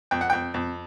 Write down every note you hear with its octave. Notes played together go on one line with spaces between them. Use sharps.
F2 G5
F#5
F2 G5
F2